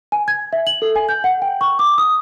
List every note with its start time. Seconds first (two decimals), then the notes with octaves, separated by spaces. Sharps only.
0.12 G#5
0.28 G#6
0.53 E5
0.67 F#7
0.82 A4
0.96 G#5
1.09 G6
1.24 F#5
1.42 G5
1.61 C#6
1.79 D6
1.98 D#6